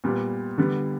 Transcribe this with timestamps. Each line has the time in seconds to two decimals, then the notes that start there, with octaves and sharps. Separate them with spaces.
0.04 A#2 G3 B3
0.58 D3 G3 B3